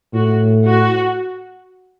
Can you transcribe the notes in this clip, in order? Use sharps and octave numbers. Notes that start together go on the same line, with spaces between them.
A2 F#4
F#4